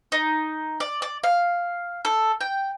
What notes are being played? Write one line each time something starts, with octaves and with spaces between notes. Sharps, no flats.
D#4
D5
D5
F5
A4
G5